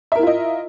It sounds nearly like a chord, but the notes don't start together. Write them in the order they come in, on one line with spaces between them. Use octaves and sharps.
E5 A#4 E4 F4 D#5